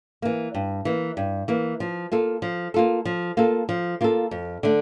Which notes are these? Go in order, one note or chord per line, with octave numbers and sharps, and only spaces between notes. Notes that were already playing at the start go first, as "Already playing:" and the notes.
E3 A#3
G2
E3 A#3
G2
E3 A#3
F3
A#3 F4 A4
F3
A#3 F4 A4
F3
A#3 F4 A4
F3
A#3 F4 A4
F2
D3 A3 D4